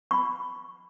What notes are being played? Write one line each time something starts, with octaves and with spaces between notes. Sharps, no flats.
B5 C#6